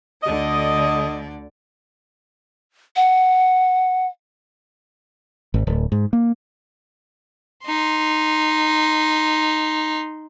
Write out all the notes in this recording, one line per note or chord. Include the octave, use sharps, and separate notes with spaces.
D2 D3 D5 D#5
F#5
G#1
D1
G#2
A#3
D#4 C6